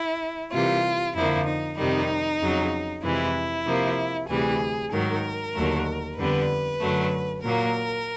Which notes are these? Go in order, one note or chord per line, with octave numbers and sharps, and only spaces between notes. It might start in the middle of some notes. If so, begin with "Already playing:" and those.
Already playing: E4
C3 E3 G3 A#3 F4
F2 D3 F3 A#3 E4
D#4
F2 C3 D#3 G3 D#4
F2 C#3 F#3
F2 C3 E3 G#3 E4
C3 F3 A#3
D2 C3 E3 G3 G#4
G#2 D#3 F#3 A#4
D#2 D3 F#3 A3
F2 D3 G3 B3 B4
F#2 D3 F#3 A3
A#2 F#3 A#3 A#4